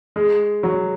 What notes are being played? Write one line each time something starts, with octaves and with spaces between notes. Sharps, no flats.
G#3
F#3